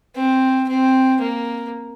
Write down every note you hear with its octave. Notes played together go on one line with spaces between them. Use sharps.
C4
C4
A#3